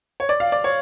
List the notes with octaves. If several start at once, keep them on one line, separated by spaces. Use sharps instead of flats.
C#5
D5
F5
D5
C#5